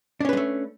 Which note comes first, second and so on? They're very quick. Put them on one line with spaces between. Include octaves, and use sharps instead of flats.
D4 C#4 B4 G#3 A3